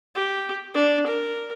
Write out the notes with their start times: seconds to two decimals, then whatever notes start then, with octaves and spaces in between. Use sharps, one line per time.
0.15 G4
0.74 D4
1.07 A#4